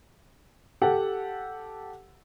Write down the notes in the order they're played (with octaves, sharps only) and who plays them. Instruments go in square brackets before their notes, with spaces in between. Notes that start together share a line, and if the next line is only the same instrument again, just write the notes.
[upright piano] G4 A4 F#5